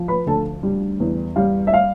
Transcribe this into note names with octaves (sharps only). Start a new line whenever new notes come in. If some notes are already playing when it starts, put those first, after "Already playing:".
Already playing: F3
B4 B5
D2 A4 A5
G3
E2
G3 F5
E5
F5